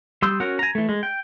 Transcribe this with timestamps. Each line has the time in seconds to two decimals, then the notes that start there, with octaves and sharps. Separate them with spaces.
0.22 G3 C6 D#6 E6 G6
0.40 C#4 F#4 A#4 F#5
0.59 G#5 A#5
0.75 E3 A3
0.89 G#3
1.03 G5